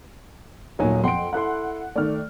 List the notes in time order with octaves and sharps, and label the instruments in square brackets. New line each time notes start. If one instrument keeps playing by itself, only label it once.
[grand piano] D#1 F#3 G#5 [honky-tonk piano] A#2 D#4
[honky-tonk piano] F2 D7 [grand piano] F#5 G5 C6
[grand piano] E4 A4 C6 [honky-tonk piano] F#5 F#6
[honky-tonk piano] D#3 D5 [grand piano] A3 F6